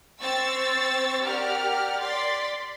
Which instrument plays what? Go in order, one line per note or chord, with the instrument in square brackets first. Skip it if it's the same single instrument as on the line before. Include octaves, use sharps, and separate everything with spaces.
[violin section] C4 C#6 E6 A6
G4 A#4 D5 F#5 F6
D5 C6 A6 B6